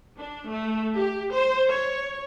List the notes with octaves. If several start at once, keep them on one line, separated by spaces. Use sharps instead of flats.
D4
A3
G4
C5
C#5